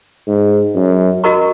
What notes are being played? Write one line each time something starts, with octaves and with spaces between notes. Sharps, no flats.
G#2
F#2
F#4 A#4 D#5 A#5 C#6